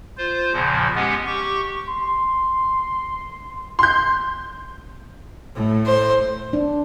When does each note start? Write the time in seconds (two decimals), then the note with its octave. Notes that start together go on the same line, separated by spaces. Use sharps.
0.18 F4 C5
0.53 E2 A#2 C#3 F3
0.96 G#3 B3 C#4 G4 F#5
1.26 G4 C#6
1.88 C6
3.79 C6 G6
5.55 A2 A3
5.86 C5
6.53 D4